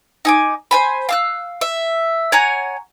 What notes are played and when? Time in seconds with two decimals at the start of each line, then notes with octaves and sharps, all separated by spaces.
0.25 D#4 G#5 D6
0.71 C5 G#5 B5
1.09 F5 E6 F#6
1.61 E5
2.32 C#5 F#5 G#5 A#5